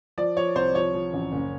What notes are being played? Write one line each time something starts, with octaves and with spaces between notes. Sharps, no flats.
F3 D5
F3 C#5
C2 C5
F3 C#5
F3
A1
F#1